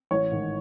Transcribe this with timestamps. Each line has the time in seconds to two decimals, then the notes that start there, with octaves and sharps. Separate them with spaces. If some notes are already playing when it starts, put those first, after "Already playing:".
0.11 A1 C#5
0.31 G#2 D#3